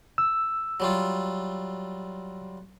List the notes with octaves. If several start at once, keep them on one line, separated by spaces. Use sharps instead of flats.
E6
F#3 G3 F4